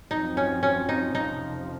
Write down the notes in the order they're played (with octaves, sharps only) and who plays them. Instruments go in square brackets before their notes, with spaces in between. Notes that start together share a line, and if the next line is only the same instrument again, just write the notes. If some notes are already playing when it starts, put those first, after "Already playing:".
[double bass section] F#2 F3 C4 [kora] D#4
[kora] C#4
C#4
D#4
[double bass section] F2 C3 F3 [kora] D#4